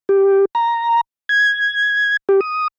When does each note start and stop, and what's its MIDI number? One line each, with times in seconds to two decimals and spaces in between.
0.09 0.45 67
0.55 1.01 82
1.29 2.17 92
2.29 2.40 67
2.41 2.68 87